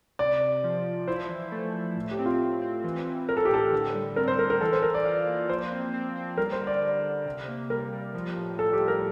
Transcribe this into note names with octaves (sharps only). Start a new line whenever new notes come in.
C3 D5
C3
F3
F3
E4 C5
E3
A3
A3
A2
G4
C4
F4
A2
C4
E3
E3
E3 A#4
A4
G4
A2 A4
D3
G3
C4 A#4
C5
G3 A#4
A#4
E3 A4
C5
E3 A#4
D5
F4
A#3
F3 C5
C4
C4
C4
G3 A#4
C5
D3
D5
D3
D3
C3
A#3
G3 A#4
G3
F3
A2
A2 A4
G4
F3
A#4